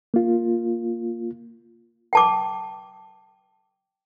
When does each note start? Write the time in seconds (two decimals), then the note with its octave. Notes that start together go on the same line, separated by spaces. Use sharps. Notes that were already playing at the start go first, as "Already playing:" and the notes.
0.14 A#3 F4
2.13 G5 A5 D6